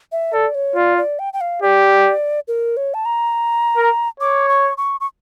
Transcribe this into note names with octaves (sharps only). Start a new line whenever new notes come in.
E5
A4 D5
C#5
F4 D5
D5
G5
G5
F5
G4 D5
A#4
C#5
A5
A#5
A#4
C#5 D6
C#6
C#6
C#6